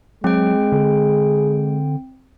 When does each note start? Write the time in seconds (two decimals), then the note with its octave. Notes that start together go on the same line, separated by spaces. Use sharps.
0.24 F#3 G#3 C4 G5
0.72 D3 G#4